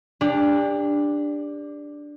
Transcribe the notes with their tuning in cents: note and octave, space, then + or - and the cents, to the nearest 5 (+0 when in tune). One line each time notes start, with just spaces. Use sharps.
D4 +0 G4 +35